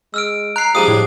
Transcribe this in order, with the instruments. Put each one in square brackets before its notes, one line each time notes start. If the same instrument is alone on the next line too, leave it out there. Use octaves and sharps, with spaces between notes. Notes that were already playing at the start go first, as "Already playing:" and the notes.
[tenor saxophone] G#3 [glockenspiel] E6 F6 D7
[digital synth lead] A#5 [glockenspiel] F#6 C7
[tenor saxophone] F3 [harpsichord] G3 G#3 D4 [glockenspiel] D#6 D#7
[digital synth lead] A2